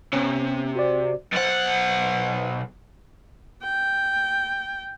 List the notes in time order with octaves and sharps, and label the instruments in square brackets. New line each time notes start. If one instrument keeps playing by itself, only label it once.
[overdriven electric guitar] C3 [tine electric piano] B3 C#4
[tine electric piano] F#4 C5 D5
[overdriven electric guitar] B1 F#5 [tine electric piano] C5 A6
[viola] G5